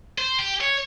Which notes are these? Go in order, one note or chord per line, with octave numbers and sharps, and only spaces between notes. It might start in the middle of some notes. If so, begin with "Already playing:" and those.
C5
G4
C#5